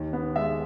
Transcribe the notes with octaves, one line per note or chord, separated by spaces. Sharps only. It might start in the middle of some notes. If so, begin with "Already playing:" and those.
Already playing: D#2 D#3
B3
G#3 E5